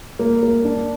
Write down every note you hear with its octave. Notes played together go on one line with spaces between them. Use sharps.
A#3
A#3
D4